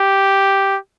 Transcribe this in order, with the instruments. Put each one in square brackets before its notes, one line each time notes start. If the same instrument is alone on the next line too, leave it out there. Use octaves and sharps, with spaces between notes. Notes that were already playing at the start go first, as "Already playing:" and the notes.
Already playing: [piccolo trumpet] G4